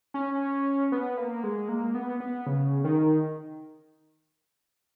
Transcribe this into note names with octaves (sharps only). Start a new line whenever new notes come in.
C#4
B3
A#3
G#3
A#3
B3
B3
C#3
D#3